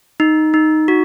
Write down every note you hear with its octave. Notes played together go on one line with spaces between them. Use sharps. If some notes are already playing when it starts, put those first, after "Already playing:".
D#4
D#4
F#4